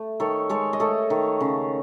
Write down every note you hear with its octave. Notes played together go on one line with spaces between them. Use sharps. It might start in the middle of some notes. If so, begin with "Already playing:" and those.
Already playing: A3
D#3 A4 C#5
G#3 A4 C#5
D#5
A3 A4 C#5
D#3
C#3